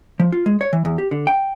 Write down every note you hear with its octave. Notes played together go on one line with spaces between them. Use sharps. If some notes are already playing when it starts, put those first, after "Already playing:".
F3
F4
G#3
C#5
E3
E2
G4
D3
G5